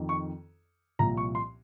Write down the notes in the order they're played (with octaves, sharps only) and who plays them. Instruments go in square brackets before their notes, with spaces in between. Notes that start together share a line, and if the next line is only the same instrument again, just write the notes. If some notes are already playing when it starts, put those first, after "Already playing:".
Already playing: [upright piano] F2 D#3
C#6
C2 A#2 F3 A#5
C#6
C6